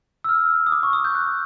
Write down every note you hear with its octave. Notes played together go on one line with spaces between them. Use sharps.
E6
F6
D#6
D6
C#6
D#6
G6
F#6